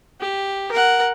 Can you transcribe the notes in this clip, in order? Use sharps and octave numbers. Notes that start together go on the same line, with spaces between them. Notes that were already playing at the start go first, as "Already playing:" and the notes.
G4
A#4 F#5